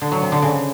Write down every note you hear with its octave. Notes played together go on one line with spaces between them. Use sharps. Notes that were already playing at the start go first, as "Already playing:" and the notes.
D3
F#3
C3
D3
C#3